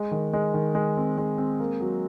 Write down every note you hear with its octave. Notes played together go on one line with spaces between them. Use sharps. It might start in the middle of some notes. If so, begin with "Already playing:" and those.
Already playing: G#3
D#3
G#3
D#3
G#3
C4
G#3
C4
A#3
F#3